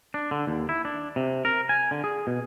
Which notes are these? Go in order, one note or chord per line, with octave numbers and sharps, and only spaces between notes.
D4
D3
D#2
E4
D4
C3
A#4
G#5
D3
G#4
B2